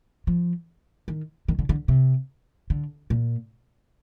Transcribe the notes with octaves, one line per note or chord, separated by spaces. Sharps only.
F3
D#3
D#3
D3
D3
C3
D3
A#2